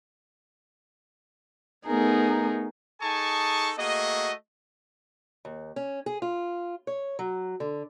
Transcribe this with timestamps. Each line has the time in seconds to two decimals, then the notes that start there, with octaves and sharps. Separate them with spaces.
1.87 A3 B3 D#4 G#4 A#4
3.01 D#4 G#4 A4 G#5 A5 C#6
3.78 A3 A#3 F#4 G#4 D#5
5.45 D#2
5.76 C#4
6.06 G#4
6.22 F4
6.87 C#5
7.19 F#3
7.60 D3